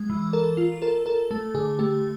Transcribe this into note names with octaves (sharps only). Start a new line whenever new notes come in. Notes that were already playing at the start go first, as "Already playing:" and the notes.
Already playing: G#3
E3
A4 A#4
F4
A4 A#4
A4 A#4
A3 A4
D3 G#4
A3 G4